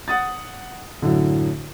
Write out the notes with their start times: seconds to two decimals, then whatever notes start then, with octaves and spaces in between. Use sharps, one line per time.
0.08 F#5 D#6 A6
1.02 F#2 A2 D3